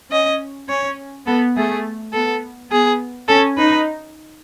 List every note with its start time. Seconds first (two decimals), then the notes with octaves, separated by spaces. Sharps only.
0.11 C#4 D#5
0.69 C#4 C#5
1.27 B3 A4
1.55 A3 G#4
2.13 B3 A4
2.71 B3 G#4
3.28 C#4 A4
3.57 D#4 B4